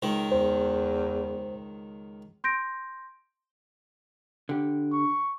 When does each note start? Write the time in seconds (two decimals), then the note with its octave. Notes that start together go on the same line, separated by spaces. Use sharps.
0.02 C#2 D#3
0.32 E2 C5
2.44 C6 G6 A#6 D7
4.49 D3 G4
4.92 C#6